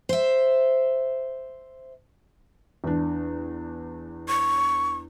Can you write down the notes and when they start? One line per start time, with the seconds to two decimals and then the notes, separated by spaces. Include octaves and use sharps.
0.09 C5 E5
2.84 E2 D4
4.28 C#6